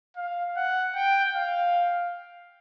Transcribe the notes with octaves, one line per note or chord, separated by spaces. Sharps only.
F5
F#5
G5
F5